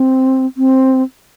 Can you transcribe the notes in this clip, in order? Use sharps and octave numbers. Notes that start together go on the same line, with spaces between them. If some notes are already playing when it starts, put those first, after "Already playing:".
Already playing: C4
C4